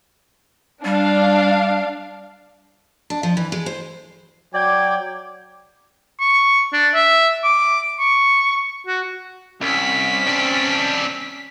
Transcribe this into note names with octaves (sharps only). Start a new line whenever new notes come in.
G3 D4 F5
D4
F3
E3
G#3
C5
F#3 D5 G5 D6 G#6
C#6
D4
E5
D6
C#6
F#4
C2 C#4 B6
C4 D4